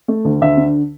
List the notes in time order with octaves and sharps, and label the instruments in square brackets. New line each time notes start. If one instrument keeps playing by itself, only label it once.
[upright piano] A3
D2
D2 E5
D3